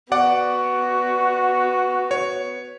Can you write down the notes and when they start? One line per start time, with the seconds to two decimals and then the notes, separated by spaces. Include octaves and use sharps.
0.12 B3 F#4 D5 F#5 D6
2.11 C#5